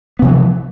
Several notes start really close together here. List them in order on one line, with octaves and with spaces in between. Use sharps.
B3 C3 F3 E3